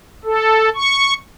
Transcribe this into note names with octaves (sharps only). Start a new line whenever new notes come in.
A4
C#6